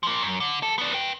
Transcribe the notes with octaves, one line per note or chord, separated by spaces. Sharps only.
F3 A#3
F#2
D3
F#2 A4
B3 D4
B4 G5